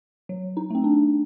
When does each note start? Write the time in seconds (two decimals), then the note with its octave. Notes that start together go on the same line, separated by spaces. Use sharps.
0.29 F#3
0.57 D#4
0.70 A3 C4
0.84 D4